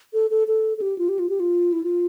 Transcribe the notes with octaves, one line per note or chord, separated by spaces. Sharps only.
A4
A4
A4
A4
G4
F4
G4
F4
G4
F4
E4
F4